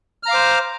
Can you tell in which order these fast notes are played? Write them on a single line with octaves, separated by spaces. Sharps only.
F6 A#5 F5 D6 C5